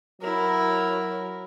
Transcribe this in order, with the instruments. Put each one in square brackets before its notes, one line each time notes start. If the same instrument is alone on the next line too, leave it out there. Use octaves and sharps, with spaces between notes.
[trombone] F#3 [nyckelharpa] E4 A#4